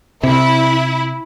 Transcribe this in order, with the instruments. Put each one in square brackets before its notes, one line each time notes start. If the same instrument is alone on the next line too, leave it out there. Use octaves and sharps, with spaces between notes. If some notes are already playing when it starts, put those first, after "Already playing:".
[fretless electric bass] C3 [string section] E4